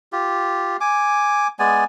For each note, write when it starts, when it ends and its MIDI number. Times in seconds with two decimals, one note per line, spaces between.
0.12 0.77 65
0.12 0.77 67
0.81 1.48 80
0.81 1.48 86
1.59 1.84 56
1.59 1.84 59
1.59 1.84 74
1.59 1.84 80